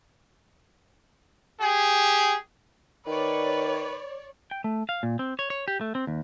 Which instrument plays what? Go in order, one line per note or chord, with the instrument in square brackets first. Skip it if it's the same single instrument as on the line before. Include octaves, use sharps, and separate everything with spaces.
[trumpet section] G4 G#4
[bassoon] D#3 [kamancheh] B4 [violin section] C#5 D5
[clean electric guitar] G5
A3
F5
A#2
C4
C#5
C#5
G4
A3
C4
D#2